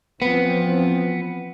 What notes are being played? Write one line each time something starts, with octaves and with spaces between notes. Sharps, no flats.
E3 F3 B3 C4